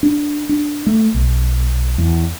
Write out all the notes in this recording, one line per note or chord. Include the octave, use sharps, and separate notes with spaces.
D4
D4
A3
B1
E2